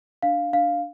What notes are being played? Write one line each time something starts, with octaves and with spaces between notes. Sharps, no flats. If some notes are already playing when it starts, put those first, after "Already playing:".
D4 F5
D4 F5